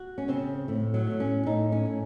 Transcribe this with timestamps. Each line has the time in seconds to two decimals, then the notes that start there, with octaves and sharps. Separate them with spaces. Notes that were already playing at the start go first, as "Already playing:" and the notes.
Already playing: F#4
0.18 C#4
0.28 C#3 C4
0.68 A2
0.94 F#3
1.07 A2
1.20 C#4
1.46 A2 D#4
1.72 C#4
1.86 A2